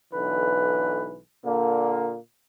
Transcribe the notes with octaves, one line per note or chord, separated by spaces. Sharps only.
B1 D3 E3 B4
A#2 D3 A#3